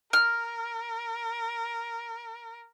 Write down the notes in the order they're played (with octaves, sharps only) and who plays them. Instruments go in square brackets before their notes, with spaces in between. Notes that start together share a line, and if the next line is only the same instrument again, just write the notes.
[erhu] A#4 [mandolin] F6